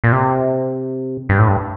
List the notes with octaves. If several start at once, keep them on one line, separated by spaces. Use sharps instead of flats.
A#2
C3
G2
A2
G2